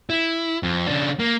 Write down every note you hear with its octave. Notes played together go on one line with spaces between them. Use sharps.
E4
F2
C#3 D4
A#3